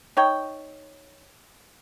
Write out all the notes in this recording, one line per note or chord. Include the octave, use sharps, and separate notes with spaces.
D#4 C#5 G5